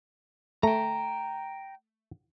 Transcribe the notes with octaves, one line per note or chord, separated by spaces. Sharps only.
A3 G5 A#5